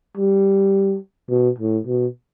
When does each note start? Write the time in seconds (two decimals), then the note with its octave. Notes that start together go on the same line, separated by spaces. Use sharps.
0.17 G3
1.30 B2
1.58 A2
1.87 B2